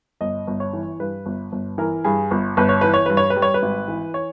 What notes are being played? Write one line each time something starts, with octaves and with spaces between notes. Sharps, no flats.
G1 D#5
G1
C#5
E3
G2 B4
G1
G1
E3 A#4
G2 G#4
G1
G1 B4
C#5
E3 B4
C#5
G2 B4
C#5
B4
G3
C#5
B4
G#1
E3
C#5